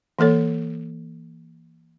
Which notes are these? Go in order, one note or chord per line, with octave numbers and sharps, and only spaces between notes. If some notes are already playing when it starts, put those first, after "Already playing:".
E3 A#3 A4 C#5